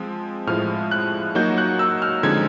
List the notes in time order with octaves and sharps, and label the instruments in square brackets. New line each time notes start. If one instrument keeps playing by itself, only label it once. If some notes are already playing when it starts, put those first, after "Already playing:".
Already playing: [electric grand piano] F3 G#3 C4
[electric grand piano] A2 F3 G#3 [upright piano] F6
[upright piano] F#6
[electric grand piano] F#3 A#3 D#4 F#4 [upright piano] G6
[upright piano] F#6
E6
F6
[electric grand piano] D3 F3 G#3 C4 D#4 [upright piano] G#6